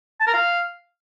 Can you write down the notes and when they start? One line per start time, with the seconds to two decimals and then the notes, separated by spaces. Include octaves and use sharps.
0.20 A5
0.27 A#4
0.34 F5